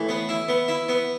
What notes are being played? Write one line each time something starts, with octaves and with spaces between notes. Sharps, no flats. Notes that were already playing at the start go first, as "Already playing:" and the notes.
Already playing: A2 E3
B3
E4
B3
E4
B3